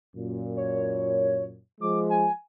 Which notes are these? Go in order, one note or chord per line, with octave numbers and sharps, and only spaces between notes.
F#2 A#2
C#5
F3 G#3 D6
G#5